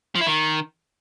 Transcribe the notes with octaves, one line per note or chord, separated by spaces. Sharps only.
F3
E4
D#3